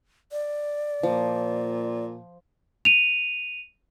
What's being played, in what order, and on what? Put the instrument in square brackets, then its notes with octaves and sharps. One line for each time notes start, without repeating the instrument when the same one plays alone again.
[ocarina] D5
[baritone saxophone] A#2 [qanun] F3
[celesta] D#7 F7